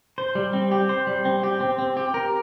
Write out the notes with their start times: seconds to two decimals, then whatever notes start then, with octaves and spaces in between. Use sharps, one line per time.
0.18 C5
0.35 G3
0.53 C4
0.72 G4
0.89 C5
1.07 G3
1.25 C4
1.44 G4
1.61 C4
1.79 C4
1.97 G4
2.14 A#4